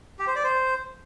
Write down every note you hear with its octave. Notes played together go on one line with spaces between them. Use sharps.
G4
C5
D5
C5